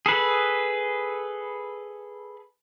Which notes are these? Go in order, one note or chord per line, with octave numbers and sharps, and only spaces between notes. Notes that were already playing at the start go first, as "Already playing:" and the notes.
G#4 A4 B4